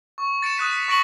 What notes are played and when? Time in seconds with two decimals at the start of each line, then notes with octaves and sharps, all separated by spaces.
0.18 C#6
0.42 A6 C#7 D7 E7
0.57 D#6 F#6 B6 D#7
0.72 B6
0.88 C#6 A#6 D7 F#7